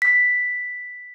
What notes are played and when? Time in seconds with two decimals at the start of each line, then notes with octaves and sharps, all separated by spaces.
0.02 B6